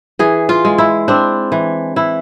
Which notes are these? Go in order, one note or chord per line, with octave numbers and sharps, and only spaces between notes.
E3 G#4
F4
G#3
E4
C4 D4
E3
E3 E4